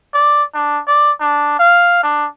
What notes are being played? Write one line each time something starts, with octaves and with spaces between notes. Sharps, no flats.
D5
D4
D5
D4
F5
D4